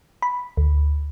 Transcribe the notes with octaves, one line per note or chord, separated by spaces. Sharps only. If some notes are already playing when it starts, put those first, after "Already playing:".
B5
D2